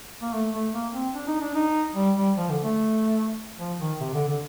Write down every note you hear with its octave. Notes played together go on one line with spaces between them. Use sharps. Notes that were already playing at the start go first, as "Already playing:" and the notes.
A#3
A3
A3
A#3
C4
D4
D#4
D4
D#4
G3
G3
F3
D3
A3
F3
D#3
C3
D3
D3